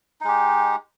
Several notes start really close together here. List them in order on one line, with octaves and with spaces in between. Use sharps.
D#4 G#3 G4